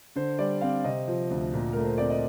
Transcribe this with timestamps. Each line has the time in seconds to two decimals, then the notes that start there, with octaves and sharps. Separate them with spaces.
0.16 D3 C5
0.39 G3 D5
0.61 C4 F5
0.84 C3 D#5
1.08 F3
1.30 D2
1.54 A#2
1.73 A3 A#4
1.85 C5
1.98 C4 D5
2.10 D#5